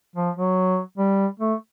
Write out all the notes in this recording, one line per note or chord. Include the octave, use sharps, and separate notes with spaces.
F3
F#3
G3
A3